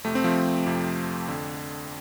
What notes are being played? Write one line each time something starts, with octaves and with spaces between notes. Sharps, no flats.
F2 C3 A3
C4
F3 A3
F2 C3
F2 D3